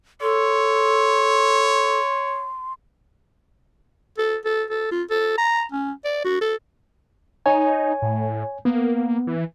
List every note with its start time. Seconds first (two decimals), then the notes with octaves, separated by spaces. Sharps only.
0.21 A4 C#5 C6
4.18 A4
4.45 A4
4.70 A4
4.91 F4
5.10 A4
5.38 A#5
5.72 C#4
6.04 D5
6.24 F#4
6.41 A4
7.46 D#4 C#5 G#5
8.02 A2
8.65 A#3 B3
9.27 E3